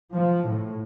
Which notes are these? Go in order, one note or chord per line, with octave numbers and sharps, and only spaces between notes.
F3
A2